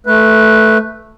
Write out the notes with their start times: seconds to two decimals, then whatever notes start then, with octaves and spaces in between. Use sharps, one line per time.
0.06 A3 B4